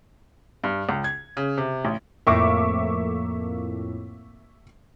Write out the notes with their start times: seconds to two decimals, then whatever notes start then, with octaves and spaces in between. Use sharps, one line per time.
0.64 G2
0.89 C#2
1.04 G#6
1.37 C#3
1.58 C3
1.84 A1
2.27 F2 A2 A#3 E5 C#6 D6